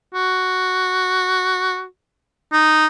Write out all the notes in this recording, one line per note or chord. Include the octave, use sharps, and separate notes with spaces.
F#4
D#4